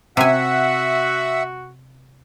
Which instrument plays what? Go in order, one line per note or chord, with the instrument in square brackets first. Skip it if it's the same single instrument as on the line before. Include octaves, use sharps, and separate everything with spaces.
[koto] C3 G#5 [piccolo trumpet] F#4 [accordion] E5 F#5